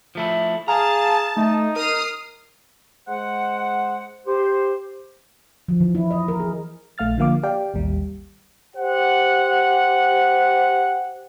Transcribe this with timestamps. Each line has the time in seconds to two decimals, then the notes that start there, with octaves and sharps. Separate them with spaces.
0.15 F3 A3 E4
0.68 G#4 F5 A5 A#5
1.37 A3 D#4
1.76 A#4 D#6 F6 C7
3.08 G#3 C5 F#5
4.27 G4 C5
5.68 F3
5.80 E3
5.95 E4
6.11 D#5
6.28 A#4
6.40 G#4
6.98 A#1 A3 F5 F6 A6
7.18 D3 F3 A#3 F5 D6
7.43 G4 D5 F5 G5
7.74 A1 D#2 G3
8.75 G4 C5 F#5